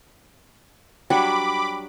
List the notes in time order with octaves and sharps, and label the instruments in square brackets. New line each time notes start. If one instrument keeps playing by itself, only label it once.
[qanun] F#3 G3 D4 [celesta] G5 [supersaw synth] B5 D6